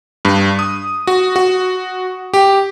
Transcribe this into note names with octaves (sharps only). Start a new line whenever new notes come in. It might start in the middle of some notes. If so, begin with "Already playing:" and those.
G2
D#6
F#4
F#4
G4